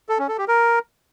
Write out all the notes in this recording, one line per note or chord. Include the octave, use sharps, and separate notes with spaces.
A4
C#4
A4
G4
A#4